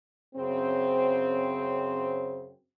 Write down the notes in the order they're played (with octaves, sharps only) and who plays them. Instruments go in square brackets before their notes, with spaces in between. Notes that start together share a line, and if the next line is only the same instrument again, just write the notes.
[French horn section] F#2 C#3 C4